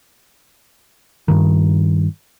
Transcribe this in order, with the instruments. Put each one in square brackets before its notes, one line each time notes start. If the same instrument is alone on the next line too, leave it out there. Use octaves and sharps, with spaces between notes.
[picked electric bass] G2 D#3